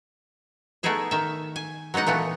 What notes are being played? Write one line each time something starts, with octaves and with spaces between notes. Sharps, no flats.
A3 B3 D#4 E4 G#4 E5
D#3 E5
G#5
F#3 G#3 B3 D#4 F#5
A#2 E3 A3 B3